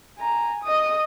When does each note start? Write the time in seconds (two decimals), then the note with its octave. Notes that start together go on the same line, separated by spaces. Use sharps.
0.18 G#5 A#5
0.64 D#5 D#6